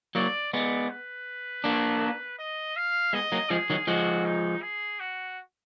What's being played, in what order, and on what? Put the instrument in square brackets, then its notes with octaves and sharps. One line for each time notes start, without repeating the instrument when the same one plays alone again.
[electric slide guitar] F#3 A#3 [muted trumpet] D5
[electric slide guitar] G#3 B3 [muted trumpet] D5
[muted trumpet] B4
[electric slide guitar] A#3 D4
[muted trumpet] D#5
F5
[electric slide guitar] G#3 B3 [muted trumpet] D#5
[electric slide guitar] F#3 A#3
[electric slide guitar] F3 G#3 [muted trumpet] G#4
[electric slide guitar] D#3 F#3
[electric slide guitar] F3 G#3 [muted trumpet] F#4
[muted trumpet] D#4
G#4
F#4